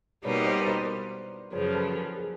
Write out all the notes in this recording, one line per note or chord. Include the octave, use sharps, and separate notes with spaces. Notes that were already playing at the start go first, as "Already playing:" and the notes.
B2 G3 A#3 D#4 B4 C#5
C5 D5
B4
A#4 C5
F#2 C#3 F3 B4 C#5
A4 B4
G#4 A#4
G#4 A#4